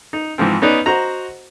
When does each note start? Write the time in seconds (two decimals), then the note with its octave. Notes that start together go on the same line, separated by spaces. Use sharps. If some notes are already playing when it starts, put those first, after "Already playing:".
0.13 D#4
0.38 G#2 E3 F3 C4
0.62 B3 C#4 D#4 B4 D5
0.86 F#4 C5 D#5 A#5